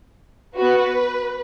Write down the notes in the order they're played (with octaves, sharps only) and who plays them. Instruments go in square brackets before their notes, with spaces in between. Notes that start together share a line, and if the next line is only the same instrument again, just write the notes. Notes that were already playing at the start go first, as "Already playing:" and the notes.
[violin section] B3 F#4 B4